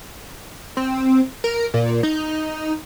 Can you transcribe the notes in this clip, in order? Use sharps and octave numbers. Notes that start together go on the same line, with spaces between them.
C4
A#4
A#2
D#4